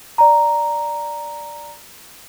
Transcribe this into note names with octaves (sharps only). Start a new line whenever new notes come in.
D5 A#5